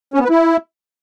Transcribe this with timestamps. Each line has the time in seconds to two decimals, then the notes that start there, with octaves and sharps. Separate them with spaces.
0.14 C#4
0.19 B3
0.25 B4
0.30 E4